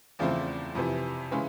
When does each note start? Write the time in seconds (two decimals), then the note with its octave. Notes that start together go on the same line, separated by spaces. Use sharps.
0.19 E2 C#3 F3 A3 C4
0.75 F2 C3 E3
1.31 C#3 E3 G#3 C#4